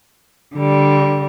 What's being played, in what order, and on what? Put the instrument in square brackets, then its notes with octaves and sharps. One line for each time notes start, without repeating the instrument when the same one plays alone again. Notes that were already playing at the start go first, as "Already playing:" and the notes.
[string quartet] D3 G3